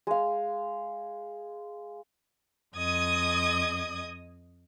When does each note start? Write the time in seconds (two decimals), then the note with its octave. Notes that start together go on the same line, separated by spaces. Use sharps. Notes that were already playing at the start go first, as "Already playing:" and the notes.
0.07 G#3 F5
2.76 F2 D#5 D#6 G#6